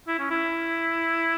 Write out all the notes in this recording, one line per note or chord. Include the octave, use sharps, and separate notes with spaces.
E4
C#4
E4